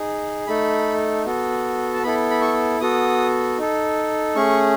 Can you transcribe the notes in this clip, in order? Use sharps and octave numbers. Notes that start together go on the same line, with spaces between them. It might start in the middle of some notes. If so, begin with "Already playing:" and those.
Already playing: D#4 G#4
A3 D#4 A4 B5
B3 F#4 A4
A5
B3 E4 A4 B5
B5
C#6
B3 F#4 A4 D#6
D#4 A4
A3 C#4 G#4 C#6